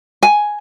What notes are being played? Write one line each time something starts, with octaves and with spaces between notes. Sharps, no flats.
G#5